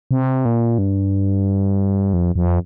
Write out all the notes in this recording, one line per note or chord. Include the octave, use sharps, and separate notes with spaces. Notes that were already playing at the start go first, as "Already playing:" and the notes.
C3
A#2
G2
F2
F2